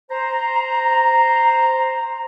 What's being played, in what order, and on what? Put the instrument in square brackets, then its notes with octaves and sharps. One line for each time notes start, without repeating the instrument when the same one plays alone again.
[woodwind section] C5 A#5